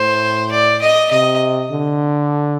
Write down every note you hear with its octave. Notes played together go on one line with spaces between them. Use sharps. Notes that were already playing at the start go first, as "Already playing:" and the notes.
Already playing: A2 C5
D5
D#5
C3 D#5
D3